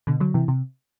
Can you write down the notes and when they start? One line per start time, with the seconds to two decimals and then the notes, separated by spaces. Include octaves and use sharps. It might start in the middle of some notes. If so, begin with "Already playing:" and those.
0.07 B2 D3
0.20 D3 F#3
0.34 C3 E3
0.48 C3